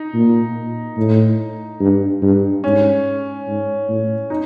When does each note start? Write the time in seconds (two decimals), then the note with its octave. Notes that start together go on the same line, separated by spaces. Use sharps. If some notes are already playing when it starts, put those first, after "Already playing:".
Already playing: D#4
0.14 A#2
0.97 A2
1.80 G2
2.22 G2
2.64 G#2 C#4
3.47 G#2
3.88 A2
4.30 D#4